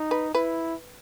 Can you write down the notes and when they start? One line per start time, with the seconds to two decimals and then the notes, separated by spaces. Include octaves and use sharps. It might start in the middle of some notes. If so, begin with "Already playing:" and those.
Already playing: D#4
0.11 B4
0.34 E4 B4